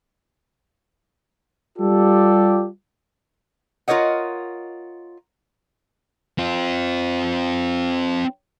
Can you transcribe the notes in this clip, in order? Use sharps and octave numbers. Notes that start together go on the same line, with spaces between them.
G3 F4 G4 A4 D5
F4 A#4 C#5 D#5 F#5
C4 F4